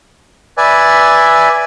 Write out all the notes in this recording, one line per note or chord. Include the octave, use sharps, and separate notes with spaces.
B4 D5 E5 G#5